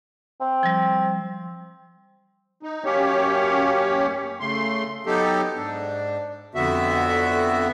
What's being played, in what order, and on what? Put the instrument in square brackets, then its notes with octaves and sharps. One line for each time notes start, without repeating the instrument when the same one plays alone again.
[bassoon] C4
[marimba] F3 G3
[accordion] D#4
F#2 A#3 C#4 G4 C#5
C#3 A3 C6
F#3 B3 D#4 G4 A4
G#2 D4
F2 D3 B3 F#4 E5